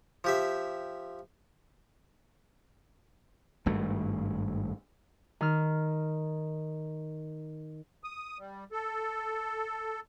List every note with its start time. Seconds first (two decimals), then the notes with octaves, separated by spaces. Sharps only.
0.24 F3 G4 E5
3.66 G#1 G2 A3
5.41 D#3 F6
8.04 D#6
8.39 G3
8.72 A4